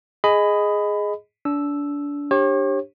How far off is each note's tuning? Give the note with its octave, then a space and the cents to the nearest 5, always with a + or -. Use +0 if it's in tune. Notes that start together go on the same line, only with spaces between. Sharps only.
G#4 +0 D#5 +0 B5 +20
D4 -30 E6 +0
D4 +0 G4 +5 C#5 -40